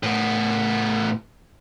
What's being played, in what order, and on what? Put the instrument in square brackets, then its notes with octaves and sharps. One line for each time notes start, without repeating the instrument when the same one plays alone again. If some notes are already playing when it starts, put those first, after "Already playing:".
[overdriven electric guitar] A2 B3